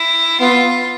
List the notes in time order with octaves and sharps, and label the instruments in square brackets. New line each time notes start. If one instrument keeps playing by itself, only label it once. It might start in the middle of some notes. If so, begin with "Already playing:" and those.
Already playing: [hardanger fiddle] E4
[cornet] B3 [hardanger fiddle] F4